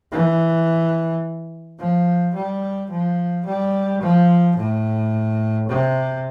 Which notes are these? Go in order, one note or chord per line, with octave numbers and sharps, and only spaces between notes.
E3
F3
G3
F3
G3
F3
A2
C3